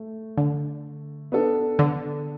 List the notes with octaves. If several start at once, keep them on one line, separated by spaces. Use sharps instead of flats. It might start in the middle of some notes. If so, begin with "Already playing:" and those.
Already playing: A3
D3
B3 D4 A4
D3